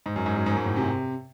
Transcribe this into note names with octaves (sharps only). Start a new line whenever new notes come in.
G#2
F#2
G#2
F#2
G#2
F#2
G#2
A2
C3